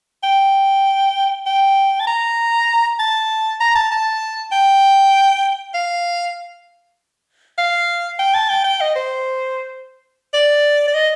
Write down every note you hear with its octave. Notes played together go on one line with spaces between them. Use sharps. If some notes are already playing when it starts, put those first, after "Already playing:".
G5
G5
A5
A#5
A5
A#5
A5
A5
G5
F5
F5
G5
A5
G5
G5
D#5
C5
D5
D5
D#5